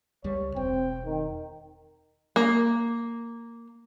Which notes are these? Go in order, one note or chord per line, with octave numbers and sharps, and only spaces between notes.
C#2 G3 C#5
E1 C4 G5
D#3
A#3